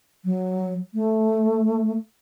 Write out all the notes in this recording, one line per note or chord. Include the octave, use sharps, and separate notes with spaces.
F#3
A3